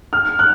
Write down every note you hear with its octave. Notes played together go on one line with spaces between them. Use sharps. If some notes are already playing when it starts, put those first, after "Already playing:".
F6
F#6